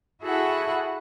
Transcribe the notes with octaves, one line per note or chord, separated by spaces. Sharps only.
E4 F#4 G#4 A4 E5 F#5